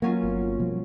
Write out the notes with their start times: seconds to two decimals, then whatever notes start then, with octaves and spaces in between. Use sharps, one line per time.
0.02 F#3 A#3 C#4 F4
0.23 G1 B3
0.59 B2 F3 G3